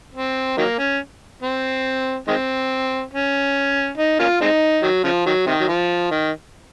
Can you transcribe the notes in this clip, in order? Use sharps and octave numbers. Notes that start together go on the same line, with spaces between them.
C4
D#3 F#3 A#3
C#4
C4
D#3 G#3 C4
C#4
D#4
A#3 C#4 F4
G#3 C4 D#4
D#3 F#3
C#3 F3
D#3 F#3
C3 D#3
F#3
F3
D#3